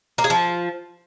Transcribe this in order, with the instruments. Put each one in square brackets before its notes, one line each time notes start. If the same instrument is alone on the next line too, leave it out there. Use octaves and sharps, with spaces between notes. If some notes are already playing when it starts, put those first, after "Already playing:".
[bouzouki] A#3
G#4
F3